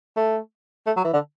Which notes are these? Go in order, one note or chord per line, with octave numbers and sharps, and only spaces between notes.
A3
A3
F#3
E3
D3